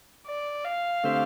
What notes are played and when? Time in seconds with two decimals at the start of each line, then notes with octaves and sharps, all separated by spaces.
0.27 D5
0.65 F5
1.04 D3 A3 C4 G4 C5